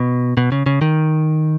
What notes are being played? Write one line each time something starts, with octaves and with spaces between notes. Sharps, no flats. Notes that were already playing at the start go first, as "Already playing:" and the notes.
Already playing: B2
B2
C#3
C#3
D#3